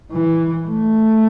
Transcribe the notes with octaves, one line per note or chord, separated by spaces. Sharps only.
E3
A3